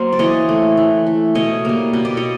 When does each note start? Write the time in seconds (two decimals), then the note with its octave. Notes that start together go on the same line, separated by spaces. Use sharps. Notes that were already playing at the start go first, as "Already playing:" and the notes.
Already playing: F#3 A#3 A#4 C5
0.12 D5
0.19 E3 C#5 D#5
0.49 A3
0.77 E3
1.06 A3
1.35 B2 C#5 D#5
1.65 G3 A#3
1.93 B2 D#5
2.05 D5
2.17 C#5 D#5